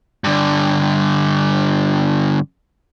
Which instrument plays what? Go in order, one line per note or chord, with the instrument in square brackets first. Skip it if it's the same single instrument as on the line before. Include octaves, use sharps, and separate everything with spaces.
[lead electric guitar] G2 D3